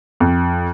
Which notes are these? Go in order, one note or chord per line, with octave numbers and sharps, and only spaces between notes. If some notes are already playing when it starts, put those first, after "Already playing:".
F2